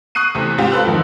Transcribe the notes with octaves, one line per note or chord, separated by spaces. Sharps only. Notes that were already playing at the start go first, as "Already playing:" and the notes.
C#6 D#6 F#6 C7 D#7
E2 C3 A3
G#2 C4 F4 G4
F4 A4 B4 C5 E6 F#6
F2 G#2 D#3